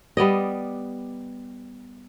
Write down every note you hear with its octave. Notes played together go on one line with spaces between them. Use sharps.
G3 B3 D5 D#5